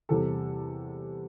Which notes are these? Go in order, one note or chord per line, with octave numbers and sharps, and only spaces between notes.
E2 C3 G3 A4